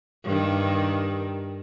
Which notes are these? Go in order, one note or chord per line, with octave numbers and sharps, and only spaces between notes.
G2 D#3